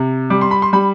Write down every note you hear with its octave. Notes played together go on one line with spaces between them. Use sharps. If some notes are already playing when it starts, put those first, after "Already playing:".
Already playing: C3
G3 D6
C6
B5
C6
G3 B5